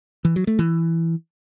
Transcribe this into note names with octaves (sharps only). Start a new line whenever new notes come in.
E3
F#3
A3
E3